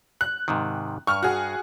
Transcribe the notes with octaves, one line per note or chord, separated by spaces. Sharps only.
F#6
G#2 C3 D#3
G2 C#6 F6
F#4 G#4